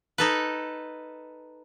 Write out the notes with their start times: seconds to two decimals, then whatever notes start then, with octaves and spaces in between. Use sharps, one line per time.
0.18 D#4 A4 B4